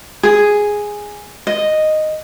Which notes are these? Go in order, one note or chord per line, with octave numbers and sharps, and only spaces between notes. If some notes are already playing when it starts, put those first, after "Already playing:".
G#4
D#5